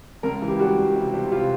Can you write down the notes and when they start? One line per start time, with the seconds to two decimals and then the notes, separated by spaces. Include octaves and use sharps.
0.23 C#2 A#4
0.42 E3
0.48 G4
0.59 G3 F#4
0.78 G3
0.96 C3
1.14 C3
1.32 C3 F4